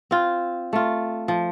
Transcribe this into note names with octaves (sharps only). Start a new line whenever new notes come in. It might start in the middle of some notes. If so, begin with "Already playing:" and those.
C4 F4
A3 F4
F3